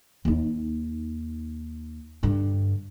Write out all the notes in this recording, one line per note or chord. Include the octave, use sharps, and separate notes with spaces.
D#2 D#4
G2 D3